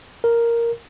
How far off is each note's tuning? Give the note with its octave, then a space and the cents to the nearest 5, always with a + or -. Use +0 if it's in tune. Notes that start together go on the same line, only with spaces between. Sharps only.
A#4 +0